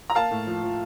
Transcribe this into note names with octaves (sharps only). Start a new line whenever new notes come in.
A#5
A#3 F5 A5
A2
F3
F3